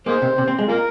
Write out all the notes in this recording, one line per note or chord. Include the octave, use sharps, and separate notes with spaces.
A#3 D#4 G#4 C5
C3
C3
C4
G#3
A#3 F4 A#4